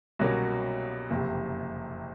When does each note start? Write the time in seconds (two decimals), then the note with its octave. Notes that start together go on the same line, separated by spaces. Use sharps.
0.19 C2 B2 F#3 A#3 C#4
1.10 F#1 F2 C3